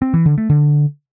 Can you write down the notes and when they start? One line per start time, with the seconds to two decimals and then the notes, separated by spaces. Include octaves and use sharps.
0.02 C4
0.14 E3
0.26 D3
0.38 A3
0.50 D3